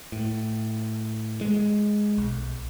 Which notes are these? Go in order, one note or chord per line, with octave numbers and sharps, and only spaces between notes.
A2
G#3
B1